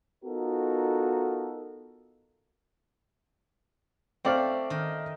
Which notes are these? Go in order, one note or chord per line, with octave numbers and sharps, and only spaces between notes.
B3 D#4 F4 F#4 A4 A#4
A3 C4 D5 F5
D#3